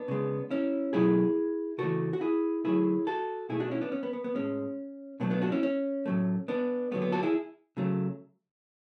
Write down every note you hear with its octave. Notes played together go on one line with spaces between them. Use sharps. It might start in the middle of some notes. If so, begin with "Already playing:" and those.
Already playing: B3 D4
C#3 G#3
C#4 E4
B2 F#3 A3 E4 G#4
C#3 E3 A3 F#4 A4
F#4
E4 G#4
D3 F#3 A3 E4 G#4
F#4 A4
B2 A3 E4 G#4
D4 F#4
C#4 E4
B3 D4
C#4
B3
B3
B3
A2 G#3 C#4
B2 F#3 A3 B3 D4
B3 D4
D4 F#4
C#4 E4
C#4
A2 F#3 A3
B3 D4
D3 F#3 A3 B3
B3
F#4 A4
E4 G#4
C#3 F#3 A3